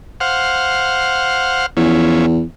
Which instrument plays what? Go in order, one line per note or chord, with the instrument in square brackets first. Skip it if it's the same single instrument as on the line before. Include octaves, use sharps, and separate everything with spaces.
[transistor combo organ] C5 F5 F#5
[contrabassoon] E2 [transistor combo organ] F3 C#4 E4